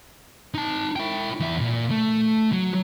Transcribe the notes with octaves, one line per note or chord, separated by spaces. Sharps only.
D#4 A5
E4 G5
E2 E5
A#2
A3
F#3